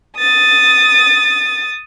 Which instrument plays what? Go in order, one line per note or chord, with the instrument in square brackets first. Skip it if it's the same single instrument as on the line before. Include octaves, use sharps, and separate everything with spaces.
[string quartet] D#6 A6